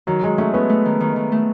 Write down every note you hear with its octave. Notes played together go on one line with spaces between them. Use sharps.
D#3 F#3
D#3 G#3
A3 C#4
B3 C#4
A3
D#3
D#3
D#3
A3